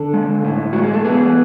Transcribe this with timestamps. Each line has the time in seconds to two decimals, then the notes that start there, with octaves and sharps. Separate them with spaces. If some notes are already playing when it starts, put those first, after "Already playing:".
Already playing: D3 A4
0.14 G#3
0.44 A2
0.73 G#3 F#4
0.83 G#4
0.93 A4
1.04 B3 G#4 B4